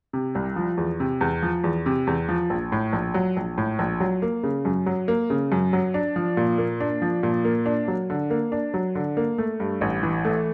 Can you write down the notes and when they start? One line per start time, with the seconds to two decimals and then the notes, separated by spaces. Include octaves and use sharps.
0.13 C3
0.35 C2
0.56 F3
0.78 E2
1.00 C3
1.21 E2
1.42 F3
1.64 E2
1.86 C3
2.07 E2
2.29 F3
2.50 A#1
2.72 A2
2.93 A#1
3.14 F#3
3.37 A#1
3.58 A2
3.79 A#1
4.00 F#3
4.22 A#3
4.43 C#3
4.65 F#2
4.86 F#3
5.08 A#3
5.30 C#3
5.52 F#2
5.73 F#3
5.94 D4
6.16 F3
6.37 A#2
6.58 A#3
6.80 D4
7.02 F3
7.23 A#2
7.45 A#3
7.66 D4
7.88 F#3
8.10 D3
8.30 A#3
8.52 D4
8.74 F#3
8.95 D3
9.17 A#3
9.38 A3
9.60 G2
9.81 A1
10.03 E3
10.25 A3